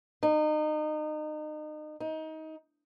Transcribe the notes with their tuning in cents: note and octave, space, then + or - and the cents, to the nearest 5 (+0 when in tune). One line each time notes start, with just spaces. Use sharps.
D#4 -30
D#4 +20